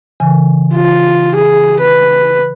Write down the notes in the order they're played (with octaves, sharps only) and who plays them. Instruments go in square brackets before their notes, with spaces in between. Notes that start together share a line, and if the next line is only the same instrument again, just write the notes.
[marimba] C#3 E3 G#5
[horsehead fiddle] F4
G#4
B4